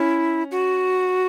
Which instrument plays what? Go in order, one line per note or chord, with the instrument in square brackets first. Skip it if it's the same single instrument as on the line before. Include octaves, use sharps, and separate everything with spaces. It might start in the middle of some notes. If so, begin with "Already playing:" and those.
Already playing: [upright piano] C#4 [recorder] E4
[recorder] F#4